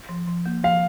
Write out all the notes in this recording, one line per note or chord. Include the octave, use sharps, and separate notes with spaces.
F3
F3
A#3
F3 F5